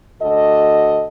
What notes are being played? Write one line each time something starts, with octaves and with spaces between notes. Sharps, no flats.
D2 F#4 A4 D#5